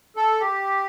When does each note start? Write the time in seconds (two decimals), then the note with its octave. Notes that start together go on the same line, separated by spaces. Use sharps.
0.16 A4
0.40 G4